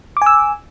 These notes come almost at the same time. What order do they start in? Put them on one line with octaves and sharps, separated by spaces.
D6 G#5 E6